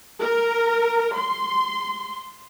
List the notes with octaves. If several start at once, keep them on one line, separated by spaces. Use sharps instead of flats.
A#4
C6